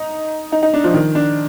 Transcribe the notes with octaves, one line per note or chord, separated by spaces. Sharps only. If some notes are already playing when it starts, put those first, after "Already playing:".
Already playing: D#4
D#4
D#4
D4
F3
D#3
D4